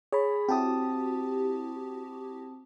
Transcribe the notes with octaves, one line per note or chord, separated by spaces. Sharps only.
G#4 C#5 B5
C4 E4 F#4 G4 A5 D#6